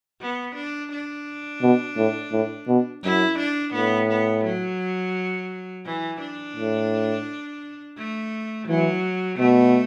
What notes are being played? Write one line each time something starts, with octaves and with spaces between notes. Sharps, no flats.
B3
D4
D4
B2
A2
A2
B2
F#2 E4
D4
A2 B3
B3
F#3
E3
D4
A2
A3
E3 F#3
B2 A3